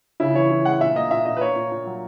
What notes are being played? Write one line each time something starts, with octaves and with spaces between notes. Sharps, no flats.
C#3 E4
E3 C#5
E3
G#3 F#5
A#2 E5
A#3 D#5
A#2 E5
A#2 D#5
B4
A#3 C#5
A#2
A#2
F#3